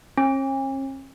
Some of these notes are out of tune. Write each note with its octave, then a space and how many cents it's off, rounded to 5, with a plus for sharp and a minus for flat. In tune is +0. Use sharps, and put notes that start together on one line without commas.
C#4 -45